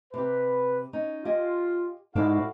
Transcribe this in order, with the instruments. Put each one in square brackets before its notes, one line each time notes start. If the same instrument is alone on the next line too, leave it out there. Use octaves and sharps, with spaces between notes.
[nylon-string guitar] C3 G4 [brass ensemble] B4
[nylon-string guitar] C#4 D#4
[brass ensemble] F4 [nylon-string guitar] G4 D#5 G#5
[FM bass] G#2 [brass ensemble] E4 F#4 F5 [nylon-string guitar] A4 D5 F#5